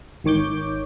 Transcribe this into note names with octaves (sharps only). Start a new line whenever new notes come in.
G#1 D#3 C#5 D6 G6